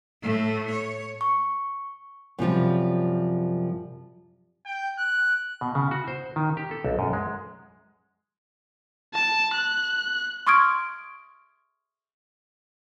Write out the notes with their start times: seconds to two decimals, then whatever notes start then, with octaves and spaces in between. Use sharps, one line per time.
0.23 A2 A3
0.71 C#5
1.21 C#6
2.39 F#2 C3 F3 G3
4.65 G5
4.99 F#6
5.61 B2
5.75 C#3
5.91 F#4
6.08 C5
6.36 D#3
6.57 G4
6.71 A4
6.85 B1
6.99 F#2
7.13 G#3
9.14 A5
9.54 F#6
10.47 C6 C#6 D#6 F6 G#6 D7